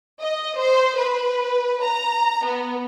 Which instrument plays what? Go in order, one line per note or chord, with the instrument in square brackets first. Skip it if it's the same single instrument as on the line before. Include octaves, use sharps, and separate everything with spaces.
[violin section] D#5
C5
B4
A#5
B3